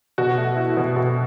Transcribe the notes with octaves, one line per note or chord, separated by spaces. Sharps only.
B2 F#4
A3
E4
B2
B2